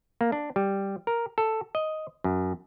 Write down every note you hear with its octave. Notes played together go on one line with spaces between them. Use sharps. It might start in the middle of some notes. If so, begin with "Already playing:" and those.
A#3
D4
G3
A#4
A4
D#5
F#2